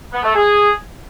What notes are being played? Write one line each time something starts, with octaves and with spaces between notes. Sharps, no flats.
B3
A3
G#4